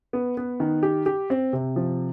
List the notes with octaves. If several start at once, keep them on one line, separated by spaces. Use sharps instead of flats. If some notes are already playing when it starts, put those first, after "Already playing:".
B3
B3
D#3
G4
G4
C4
C3
F3